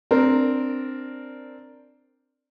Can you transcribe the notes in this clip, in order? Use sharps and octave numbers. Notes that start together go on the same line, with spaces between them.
C4 D4 A#4